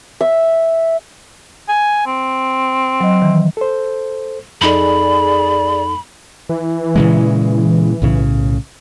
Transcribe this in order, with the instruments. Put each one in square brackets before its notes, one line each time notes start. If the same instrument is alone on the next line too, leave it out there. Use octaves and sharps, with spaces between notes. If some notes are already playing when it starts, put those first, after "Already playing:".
[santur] E5
[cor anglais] G#5
C4
[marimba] F#3 D#5
D#3 E3
[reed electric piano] A4 C5
[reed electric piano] F2 D#4 A4 [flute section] G#4 D5 [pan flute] B5
[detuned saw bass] E3
[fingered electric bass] A#2 C#3 G#3
B1 A2 C#3